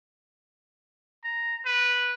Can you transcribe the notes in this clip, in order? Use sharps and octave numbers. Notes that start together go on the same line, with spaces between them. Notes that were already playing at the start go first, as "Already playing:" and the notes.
A#5
B4